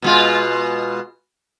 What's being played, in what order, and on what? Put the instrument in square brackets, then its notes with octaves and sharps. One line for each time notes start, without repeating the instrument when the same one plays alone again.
[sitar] B2 G#3 F4